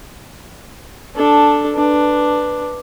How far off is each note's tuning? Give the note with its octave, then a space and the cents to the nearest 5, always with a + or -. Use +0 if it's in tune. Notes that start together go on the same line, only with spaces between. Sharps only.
D4 +0 A4 +0
D4 +5 B4 +0